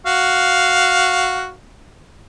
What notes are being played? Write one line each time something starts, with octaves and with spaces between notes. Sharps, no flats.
F#4 F5